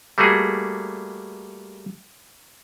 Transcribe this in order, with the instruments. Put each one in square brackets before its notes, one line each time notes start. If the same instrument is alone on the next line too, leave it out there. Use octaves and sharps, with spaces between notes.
[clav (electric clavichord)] G3 A3 A#3 F#4 G#4